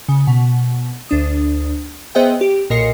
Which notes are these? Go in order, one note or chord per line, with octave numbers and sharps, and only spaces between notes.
C#3
B2
D2 D4 D#6
B3 G#4 C5 D#5 E5 G5
G4
B1 A#2 A#4 D#5 C7 C#7